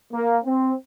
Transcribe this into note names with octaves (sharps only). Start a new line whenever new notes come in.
A#3
C4